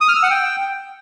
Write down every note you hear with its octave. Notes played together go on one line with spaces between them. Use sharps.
D#6
F6
E6
F#5
G5